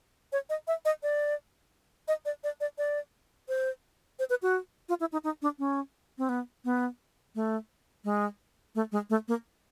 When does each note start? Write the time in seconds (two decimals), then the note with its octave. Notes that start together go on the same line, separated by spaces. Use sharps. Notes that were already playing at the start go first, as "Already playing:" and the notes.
0.32 C#5
0.49 D#5
0.67 E5
0.85 D#5
1.03 D5
2.08 D#5
2.25 D5
2.44 D5
2.60 D5
2.78 D5
3.48 C5
4.19 C5
4.30 B4
4.42 F#4
4.89 F4
5.00 E4
5.12 D#4
5.24 D#4
5.42 D4
5.59 C#4
6.18 C4
6.29 B3
6.65 B3
7.35 A3
8.04 G#3
8.75 A3
8.92 G#3
9.10 A3
9.28 A#3